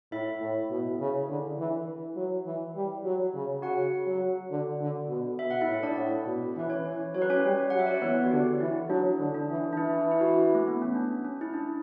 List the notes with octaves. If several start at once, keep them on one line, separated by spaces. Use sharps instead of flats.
A2 E4 E5
A2
B2
C#3
D3
E3
F#3
E3
G3
F#3
C#3
C#3 F#4 F#5
F#3
D3
D3
B2
B2 E5
F#5
E4 E5
A2
D4 D5
A2
B2
E3 B4
C#4 C#5
E3
F#3 C#5
B4
C#4 C#5
G3
F#3 F#5
E5
D5
C#5
E3 B3 B4
F#4
D3 G4
E3 E4
F#3 D4
D3
D4
E3
D4
E3 E4
E4
F#4
A3
B3
C#4
D4
C#4
E4
D4